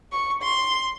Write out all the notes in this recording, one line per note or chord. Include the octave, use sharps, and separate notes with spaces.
C#6
C6